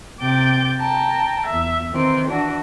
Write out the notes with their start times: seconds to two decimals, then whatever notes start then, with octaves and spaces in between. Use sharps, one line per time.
0.21 C3 G5 D6 G6 A6
0.78 G5 A5 A#5
1.46 E2 E5
1.91 D#3 E3 C4
2.28 E3 D4 F#4